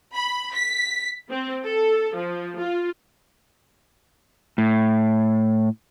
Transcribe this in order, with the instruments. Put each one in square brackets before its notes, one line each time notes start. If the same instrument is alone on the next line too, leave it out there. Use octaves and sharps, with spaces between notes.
[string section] B5
B6
C4
A4
F3
F4
[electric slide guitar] A2